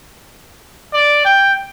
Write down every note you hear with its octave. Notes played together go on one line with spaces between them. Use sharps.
D5
G5